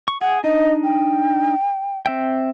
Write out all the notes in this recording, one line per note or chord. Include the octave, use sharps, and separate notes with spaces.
C#6
G#4 F#5
D4 D#4 D#5
G5
C4 E5 G5